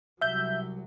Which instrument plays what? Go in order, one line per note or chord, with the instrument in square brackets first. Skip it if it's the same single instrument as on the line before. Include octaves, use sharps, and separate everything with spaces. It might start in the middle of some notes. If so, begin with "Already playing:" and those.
[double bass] C2 F#3 [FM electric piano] E5 G6